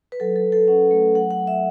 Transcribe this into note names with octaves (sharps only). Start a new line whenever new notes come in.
B4
F#3 A4
A4
F#3
A4
C#4 F#5
A3
F#3 F#5
F#5
F#3
E5